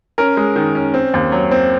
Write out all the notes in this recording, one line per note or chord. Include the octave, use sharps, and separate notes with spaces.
C#4 A#4
G#3
D#3
C#4
C4
D#2
F#3
C4